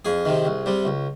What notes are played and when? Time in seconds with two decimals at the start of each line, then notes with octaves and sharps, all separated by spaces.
0.05 F2 G#4
0.26 C3 D#3
0.45 C2
0.66 C3 G3
0.85 C#2